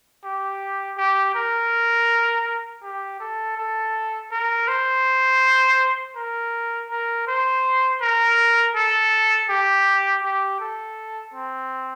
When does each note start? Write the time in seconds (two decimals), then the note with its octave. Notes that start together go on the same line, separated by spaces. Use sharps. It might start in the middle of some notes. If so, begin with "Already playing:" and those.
0.24 G4
0.98 G4
1.35 A#4
2.83 G4
3.20 A4
3.57 A4
4.31 A#4
4.68 C5
6.16 A#4
6.90 A#4
7.27 C5
8.01 A#4
8.75 A4
9.49 G4
10.23 G4
10.60 A4
11.34 C4